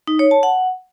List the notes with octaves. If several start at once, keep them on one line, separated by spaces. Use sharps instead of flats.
D#4
C#5
A5
F#5